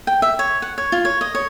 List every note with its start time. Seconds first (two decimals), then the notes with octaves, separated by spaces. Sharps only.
0.07 G5
0.22 E5
0.39 C#5
0.62 F#5
0.78 C#5
0.92 F4
1.05 C#5
1.21 D#5
1.35 C#5